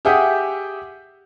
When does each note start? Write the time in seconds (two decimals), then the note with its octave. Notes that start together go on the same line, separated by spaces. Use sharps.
0.05 G4 G#4 E5 F#5 D#6 G6